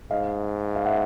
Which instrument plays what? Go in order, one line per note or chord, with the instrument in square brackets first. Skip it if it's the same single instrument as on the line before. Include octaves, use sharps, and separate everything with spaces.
[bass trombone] G#2 [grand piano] D#5 F5
[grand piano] F5
E5 F#5